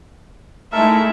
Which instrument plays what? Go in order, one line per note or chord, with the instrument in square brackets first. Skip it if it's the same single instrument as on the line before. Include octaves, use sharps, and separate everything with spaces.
[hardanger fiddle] G#3 E5 [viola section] A3 D#4 E4 [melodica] A4 A#4